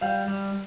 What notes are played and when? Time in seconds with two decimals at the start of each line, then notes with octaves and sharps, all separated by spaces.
0.01 G3 F5
0.28 G3